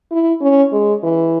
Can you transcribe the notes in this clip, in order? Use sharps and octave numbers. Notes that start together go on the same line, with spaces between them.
E4
C#4
G#3
E3